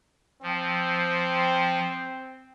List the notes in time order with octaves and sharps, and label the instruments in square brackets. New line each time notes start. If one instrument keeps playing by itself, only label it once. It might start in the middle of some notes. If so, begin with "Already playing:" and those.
[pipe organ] F3 [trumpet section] C4